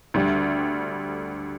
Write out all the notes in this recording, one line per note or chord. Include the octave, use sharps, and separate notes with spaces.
D2 D3 G3